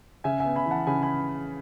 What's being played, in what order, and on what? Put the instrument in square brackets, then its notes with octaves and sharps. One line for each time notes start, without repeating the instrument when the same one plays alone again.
[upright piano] C#3 [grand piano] E5 G#5
[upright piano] B3 [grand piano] E5 G#5
[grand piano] G#5 B5
[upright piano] E3
[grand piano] F#5 A5
[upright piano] C#3 [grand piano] G#5 B5
[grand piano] G#5 B5